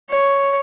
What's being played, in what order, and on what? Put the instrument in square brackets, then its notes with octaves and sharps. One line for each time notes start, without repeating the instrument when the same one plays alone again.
[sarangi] C#5